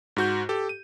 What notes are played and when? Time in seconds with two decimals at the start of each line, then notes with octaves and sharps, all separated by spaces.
0.16 G#2 F#4 G6
0.49 G4 A4
0.69 D#7